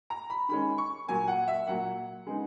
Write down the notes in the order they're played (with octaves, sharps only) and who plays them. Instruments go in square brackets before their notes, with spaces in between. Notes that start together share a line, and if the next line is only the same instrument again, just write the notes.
[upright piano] A#5
B5
D#3 G#3 C#4 B5
C#6
A#2 F#3 A#3 G#5
F#5
E5
A#2 F#3 A#3 F#5
C#3 G#3 B3 D#4